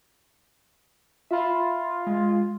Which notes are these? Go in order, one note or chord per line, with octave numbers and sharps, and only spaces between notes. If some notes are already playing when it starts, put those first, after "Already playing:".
F4 E5 B5
G#3